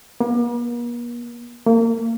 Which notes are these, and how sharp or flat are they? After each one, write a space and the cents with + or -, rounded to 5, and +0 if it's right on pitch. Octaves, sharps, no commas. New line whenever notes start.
A#3 +45
A#3 -30